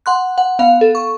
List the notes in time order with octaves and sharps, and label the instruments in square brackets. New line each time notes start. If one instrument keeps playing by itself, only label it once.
[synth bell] F#5 C6 F#6
F#5
B3 F5
A4
C#6